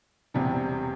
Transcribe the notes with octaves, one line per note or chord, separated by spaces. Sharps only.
E1 E2 C3 G3